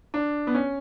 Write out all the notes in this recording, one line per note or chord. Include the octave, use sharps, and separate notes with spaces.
D4
B3
C#4